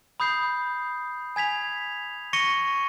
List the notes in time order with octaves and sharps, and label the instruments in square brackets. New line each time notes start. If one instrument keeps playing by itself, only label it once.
[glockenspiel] B5 D#6 G6 C7
G#5 G#6 B6 F7
C#6 A#6 C#7 D#7 G7